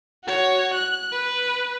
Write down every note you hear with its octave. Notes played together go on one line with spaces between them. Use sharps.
F#4 C#5
F#6
B4